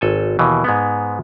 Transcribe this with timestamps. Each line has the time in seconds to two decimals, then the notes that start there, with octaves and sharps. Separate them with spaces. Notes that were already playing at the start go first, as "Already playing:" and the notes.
0.01 G#1 A4 G#5
0.39 D#2 B2 E3
0.64 G#2 G#3 B3